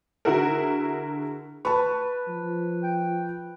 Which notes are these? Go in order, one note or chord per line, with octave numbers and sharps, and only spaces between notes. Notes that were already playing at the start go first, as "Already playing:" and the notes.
D3 E4 F#4 G#4 A#4
B4 A5 C#6
F3
G5